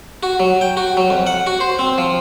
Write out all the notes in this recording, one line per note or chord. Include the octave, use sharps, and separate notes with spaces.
F#4
F#3
G5
F#4
F#3
F2
F#5
F#4
C5
C4
F3